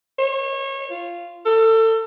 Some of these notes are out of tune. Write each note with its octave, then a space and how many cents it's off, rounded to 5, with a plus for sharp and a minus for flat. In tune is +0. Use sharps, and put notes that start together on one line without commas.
C#5 -30
F4 -10
A4 +30